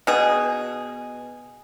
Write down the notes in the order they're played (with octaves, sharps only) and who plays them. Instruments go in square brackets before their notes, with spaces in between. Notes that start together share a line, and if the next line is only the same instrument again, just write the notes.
[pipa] B2 G#4